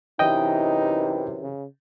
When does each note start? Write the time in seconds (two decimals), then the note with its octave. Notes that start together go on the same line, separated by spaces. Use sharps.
0.19 F#2 C3 E3 D#4 D#5 G5
1.41 C#3